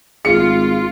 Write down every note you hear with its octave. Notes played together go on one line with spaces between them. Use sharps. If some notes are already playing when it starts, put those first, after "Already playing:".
G#1 F4 G#4 C#7